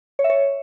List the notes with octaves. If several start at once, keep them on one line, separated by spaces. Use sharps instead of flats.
C#5
E5
C#5